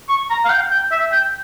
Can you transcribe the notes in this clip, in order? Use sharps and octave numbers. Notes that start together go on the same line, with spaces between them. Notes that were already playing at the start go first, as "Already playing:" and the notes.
C#6
A#5
F5
G5
G5
E5
G5